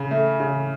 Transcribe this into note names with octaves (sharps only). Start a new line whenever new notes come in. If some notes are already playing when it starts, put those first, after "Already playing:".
Already playing: C#3
A3
C#3